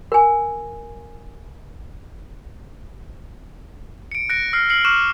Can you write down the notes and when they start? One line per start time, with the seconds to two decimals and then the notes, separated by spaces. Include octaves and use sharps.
0.12 A#4 G#5
4.12 C#7 D7
4.29 F#6 A#6 C#7 D7
4.53 E6 F6 A#6 C7
4.69 E6 F6 C7 C#7 F#7
4.85 C#6 D6 F6 F#6 D7 E7